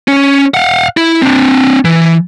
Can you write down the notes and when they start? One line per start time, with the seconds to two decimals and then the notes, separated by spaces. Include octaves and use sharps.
0.08 C#4
0.54 F5 F#5
0.97 E4
1.22 C4 D4
1.85 E3